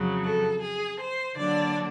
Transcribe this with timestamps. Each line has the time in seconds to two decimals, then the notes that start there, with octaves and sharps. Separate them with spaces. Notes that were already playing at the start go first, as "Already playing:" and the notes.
Already playing: F2 C#3 F#3
0.23 A4
0.61 G#4
0.99 C5
1.37 D3 F#3 A#3 D4 D5